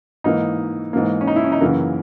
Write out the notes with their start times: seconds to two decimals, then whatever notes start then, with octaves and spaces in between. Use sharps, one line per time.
0.24 G#2 E3 A#3 D#4
0.93 G#2 E3 A#3
1.21 C#4
1.27 D#4
1.36 E4
1.44 C#4
1.52 D#4
1.61 F#2 C#3 E3 A#3 A#4